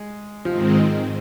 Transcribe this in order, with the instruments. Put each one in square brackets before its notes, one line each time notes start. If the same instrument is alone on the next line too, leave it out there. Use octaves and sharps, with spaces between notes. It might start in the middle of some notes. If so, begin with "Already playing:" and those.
Already playing: [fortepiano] G#3
[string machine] G#2 D#3 G#3 C4 [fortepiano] F3